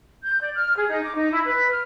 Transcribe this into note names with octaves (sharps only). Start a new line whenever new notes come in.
G6
D5
F6
G#4
D#4
D6
D#4
E4
B4
F6